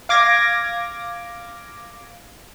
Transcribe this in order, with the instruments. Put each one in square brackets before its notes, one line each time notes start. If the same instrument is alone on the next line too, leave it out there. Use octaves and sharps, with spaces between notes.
[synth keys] F5 D6 G#6 A#6